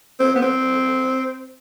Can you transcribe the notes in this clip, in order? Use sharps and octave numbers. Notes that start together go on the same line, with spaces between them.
C4
B3
C4